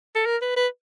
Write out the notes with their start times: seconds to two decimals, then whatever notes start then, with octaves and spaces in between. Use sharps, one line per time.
0.15 A4
0.26 A#4
0.42 B4
0.57 B4